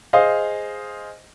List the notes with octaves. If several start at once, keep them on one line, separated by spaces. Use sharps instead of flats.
G#4 C5 D#5 F5